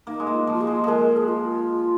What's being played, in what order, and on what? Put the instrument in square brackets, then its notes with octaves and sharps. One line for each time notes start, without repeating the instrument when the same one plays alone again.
[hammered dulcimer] A#3 [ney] D#4
[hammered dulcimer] G#3
A#3
[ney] F4
[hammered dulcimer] F3
[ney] F4
G#4
[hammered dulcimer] G#3
[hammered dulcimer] F3 G#3 [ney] A#4
[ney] G#4
F4